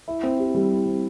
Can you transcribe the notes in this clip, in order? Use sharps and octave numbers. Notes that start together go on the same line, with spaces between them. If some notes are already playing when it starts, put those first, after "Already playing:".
E4
C4
G4
G3
E4
C4